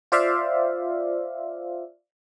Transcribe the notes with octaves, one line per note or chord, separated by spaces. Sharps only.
F4 C5 D5 E5 F5